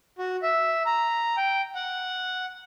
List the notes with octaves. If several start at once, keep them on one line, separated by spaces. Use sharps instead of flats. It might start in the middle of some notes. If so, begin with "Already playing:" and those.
F#4
E5
A#5
G5
F#5